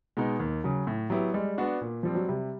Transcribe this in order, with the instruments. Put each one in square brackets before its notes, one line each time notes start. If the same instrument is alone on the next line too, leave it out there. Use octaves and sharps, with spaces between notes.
[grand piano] B2 G#3 B3 D#4
D#2
C#3 F#3
A2
F#3 B3 E4 G4
[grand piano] G3 [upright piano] G#3
[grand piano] B3 D4 F#4
A#2
[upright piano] F3 [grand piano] G3 C4
[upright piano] F#3
[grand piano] C3 [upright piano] G3